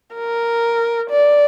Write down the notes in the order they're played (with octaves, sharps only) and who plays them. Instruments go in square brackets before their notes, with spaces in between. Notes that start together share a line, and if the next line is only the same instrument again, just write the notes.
[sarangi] A#4
D5